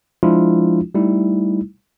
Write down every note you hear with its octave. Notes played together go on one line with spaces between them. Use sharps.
F3 G#3 D4 E4 F4
G3 A3 D#4 E4